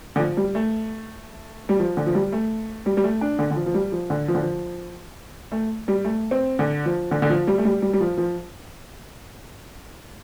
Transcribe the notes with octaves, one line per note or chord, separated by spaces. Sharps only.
D3
F3
G3
A3
G3
F3
D3
F3
G3
A3
G3
G3
A3
D4
D3
D3
F3
F3
G3
F3
D3
F3
D3
F3
A3
G3
A3
C4
D3
F3
D3
D3
F3
G3
A3
G3
G3
G3
F3
F3